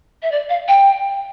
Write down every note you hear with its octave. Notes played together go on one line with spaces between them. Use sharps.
E5
D5
F5
G5